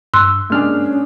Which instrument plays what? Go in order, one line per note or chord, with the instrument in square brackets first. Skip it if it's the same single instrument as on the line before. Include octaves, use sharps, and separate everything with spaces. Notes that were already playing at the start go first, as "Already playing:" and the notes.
[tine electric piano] G2 [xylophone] C6 E6 F#6
[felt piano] G#2 D4 G#4 [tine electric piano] A#3 F6 [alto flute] C#4